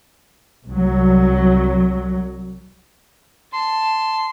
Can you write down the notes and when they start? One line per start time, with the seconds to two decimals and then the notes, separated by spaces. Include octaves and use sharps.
0.66 C2 F#3
3.53 A5 C6